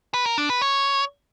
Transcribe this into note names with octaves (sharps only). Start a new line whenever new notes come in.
B4
A#4
D4
B4
C#5